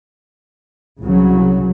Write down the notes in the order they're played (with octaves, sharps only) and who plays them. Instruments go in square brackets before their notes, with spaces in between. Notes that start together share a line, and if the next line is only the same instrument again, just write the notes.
[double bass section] C2 C#3 F#3